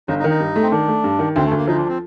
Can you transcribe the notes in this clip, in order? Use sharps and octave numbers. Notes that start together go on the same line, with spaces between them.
G1 D#4
D#4
D#3
D#4
G2
A3
C4
D#3 D4
A3
G2
D#3
D2 C4
A3
D2
A#3
F3 D#4
D4
C4